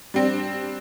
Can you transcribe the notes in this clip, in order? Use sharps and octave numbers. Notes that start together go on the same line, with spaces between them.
G3 C4 D4